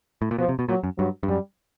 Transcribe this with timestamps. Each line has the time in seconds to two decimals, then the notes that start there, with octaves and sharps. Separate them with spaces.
0.22 A2
0.31 A#2
0.38 B2 F3
0.49 C3
0.59 B2
0.69 A#2 F#3
0.83 F#2
0.98 G2 F#3
1.23 G2
1.28 F#2 G3